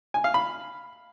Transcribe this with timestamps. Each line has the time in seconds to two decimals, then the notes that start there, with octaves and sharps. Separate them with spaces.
0.14 G#5
0.24 F5
0.34 B5